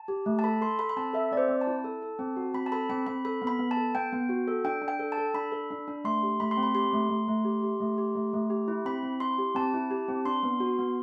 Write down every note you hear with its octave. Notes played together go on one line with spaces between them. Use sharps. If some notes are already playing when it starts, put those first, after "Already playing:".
Already playing: A5
G4
A3
A5
A4 B5
A4 C6
A4 B5
B5
C4 A5
A4 E5
C4 D5
C5
C4
A5
E4
A4
A4
C4
F#4
C4 B5
A5
A4 B5
C4 B5
C4 B5
A4 B5
B3
B5
B3
A5
A4
B3 G5
B3
F#4
A4
D4 G5
D4
G5
A4
A5
A4
D4 B5
A4
D4
D4
A3 C6
G4
A3 B5
C6
C4
B5
G4 C6
A3
A3
A3
G4
G4
A3
G4
A3
A3
G4
E4
C4 B5
C4
E4 C6
G4
C4 A5
E4
G4
C4
D4 C6
B3
F#4
B3